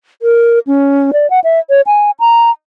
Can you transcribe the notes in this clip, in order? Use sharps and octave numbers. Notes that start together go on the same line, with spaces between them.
A#4
C#4
D5
F#5
E5
C#5
G#5
A#5